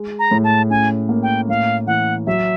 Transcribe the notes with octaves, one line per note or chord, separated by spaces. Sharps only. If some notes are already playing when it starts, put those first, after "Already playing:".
Already playing: G#3
A#5
A2
A5
C#4 G#5
A#3
G5
A2 F5
E3 F#5
F#3 E5